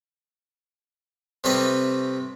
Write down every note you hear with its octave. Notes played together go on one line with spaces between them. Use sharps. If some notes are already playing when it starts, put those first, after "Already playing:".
C3 G3 A3 C4 B4 D#5